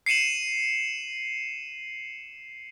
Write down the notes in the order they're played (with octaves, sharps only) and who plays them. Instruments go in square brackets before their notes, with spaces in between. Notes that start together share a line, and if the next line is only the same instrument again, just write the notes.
[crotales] C7 C#7 D#7 E7 F#7